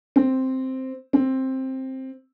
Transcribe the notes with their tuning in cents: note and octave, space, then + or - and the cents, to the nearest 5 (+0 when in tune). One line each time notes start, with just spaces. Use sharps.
C4 +0
C4 +10